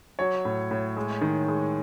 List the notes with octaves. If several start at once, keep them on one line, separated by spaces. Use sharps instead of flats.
F#3 C#5
A2
A2
G#3
D#3
G#3